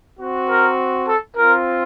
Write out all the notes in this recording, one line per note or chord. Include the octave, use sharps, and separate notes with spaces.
C4 F#4
A#4
A4
C4 F4 A#4